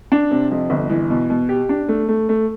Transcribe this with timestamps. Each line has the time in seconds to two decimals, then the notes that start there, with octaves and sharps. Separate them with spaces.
0.12 D4
0.31 C3
0.51 F2
0.70 G1
0.90 E3
1.10 B2
1.30 B2
1.49 G4
1.69 D4
1.89 A3
2.09 A3
2.29 A3